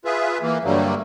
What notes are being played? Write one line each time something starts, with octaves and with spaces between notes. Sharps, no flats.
F4 G#4 B4 E5
E3 A#3
G2 D3 F#3 G3 A3 A#3